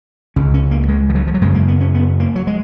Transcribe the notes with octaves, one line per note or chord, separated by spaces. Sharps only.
C#2 C#3 C#4
C#4
A#3
G#3
F3
F#3
F3
F#3
F#2 C#3 G#3
A#3
B3
C#4
B3
A#3
F#3
G#3